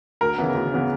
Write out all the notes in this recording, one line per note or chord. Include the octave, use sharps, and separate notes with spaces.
D2 A#4
C#3 E3 B3
D2
C#3 E3 B3